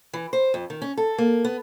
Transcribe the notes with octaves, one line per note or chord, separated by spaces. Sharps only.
E3
C5
F2
D#3
C#4
A4
A#3
B3